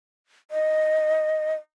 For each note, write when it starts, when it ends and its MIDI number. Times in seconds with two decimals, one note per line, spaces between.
0.51 1.54 75